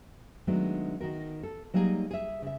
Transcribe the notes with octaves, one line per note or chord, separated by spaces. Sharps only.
D#3 F#3 G#3 A3 B3 D4
D#3 F#4 A#4
A4
F#3 G3 A#3 D#4 G#4
G#4 E5
C#3 E5